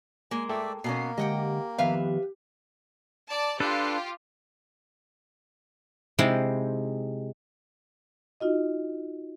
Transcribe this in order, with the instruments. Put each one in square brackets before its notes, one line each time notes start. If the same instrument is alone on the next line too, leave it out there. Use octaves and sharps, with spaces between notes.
[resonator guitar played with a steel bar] G#3 A#3 [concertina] G#5
[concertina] A3 D5 E5 [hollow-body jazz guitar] A4 G5 A5
[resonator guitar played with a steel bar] B2 B3 C#4 [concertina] A#3 [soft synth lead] C7
[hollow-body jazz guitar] D3 G#3 [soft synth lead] G4 [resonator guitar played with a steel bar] D#5 F#5 G5
[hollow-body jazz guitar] D#3 F3 B3 [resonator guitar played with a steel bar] B4 E5 F5
[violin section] D5 A5
[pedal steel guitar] D4 A4 B4 [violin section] F4 G4
[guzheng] C3 G#3 C4 D#4 E4 C5
[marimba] D#4 F4 F#4 D#5